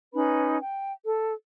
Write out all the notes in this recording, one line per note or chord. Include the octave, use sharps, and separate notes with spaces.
C#4 D#4 B4 B5
G5
A4